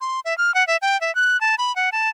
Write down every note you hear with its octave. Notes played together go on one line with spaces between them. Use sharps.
C6
E5
F6
F#5
E5
G5
E5
F#6
A5
B5
F#5
A5